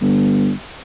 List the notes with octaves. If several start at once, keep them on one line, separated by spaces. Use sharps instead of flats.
G1